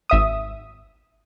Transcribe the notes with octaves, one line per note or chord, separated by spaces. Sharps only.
G#1 E5 D#6